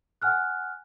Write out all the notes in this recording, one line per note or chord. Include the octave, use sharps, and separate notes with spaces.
F#5 G#5 F6 F#6